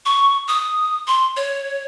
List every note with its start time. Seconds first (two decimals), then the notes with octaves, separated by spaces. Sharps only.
0.06 C#6
0.48 D#6
1.07 C6
1.36 C#5